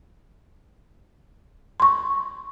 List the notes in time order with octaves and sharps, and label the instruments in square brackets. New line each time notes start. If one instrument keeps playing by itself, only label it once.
[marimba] C6 C#6